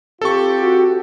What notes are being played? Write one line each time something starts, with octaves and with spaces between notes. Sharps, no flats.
C4 F4 G4 A4 C#6
F#4